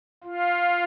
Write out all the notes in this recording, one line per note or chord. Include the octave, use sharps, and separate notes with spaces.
F4